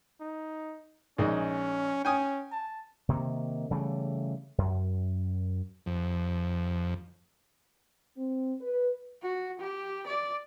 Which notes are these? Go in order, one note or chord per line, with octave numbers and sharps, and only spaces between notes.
D#4
A#1 G#3 C#4 D#4
C#4 G5 G#5 D#6
A5
C3 D#3 A#3
C#3 E3 G3 A3
F#2
F2
C4
B4
F#4
G4
D5